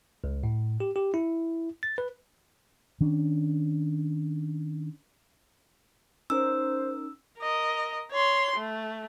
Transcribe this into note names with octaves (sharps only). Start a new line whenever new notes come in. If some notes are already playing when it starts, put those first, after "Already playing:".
C#2
A2
G4
G4
E4
A6
B4
D#3 C#4 D4
C#4 D#4 A#4 C5 E6
A#4 D#5
C#5 C6
A3